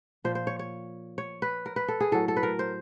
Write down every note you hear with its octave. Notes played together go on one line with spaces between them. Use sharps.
A#2 F3 C5
C5
C#5
C#5
C#5
B4
A#4
B4
A4
G#4
A2 F#3 A4
A4
B4
A#4
C5